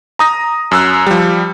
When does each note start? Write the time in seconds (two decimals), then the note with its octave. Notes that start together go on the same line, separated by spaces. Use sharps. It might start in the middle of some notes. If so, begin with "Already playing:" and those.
0.19 A#5 D#6 A#6
0.71 F#2 E6 F#6
1.06 F3 G3